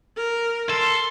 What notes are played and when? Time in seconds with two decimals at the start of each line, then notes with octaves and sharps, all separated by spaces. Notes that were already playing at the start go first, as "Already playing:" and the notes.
0.17 A#4
0.70 A4 C6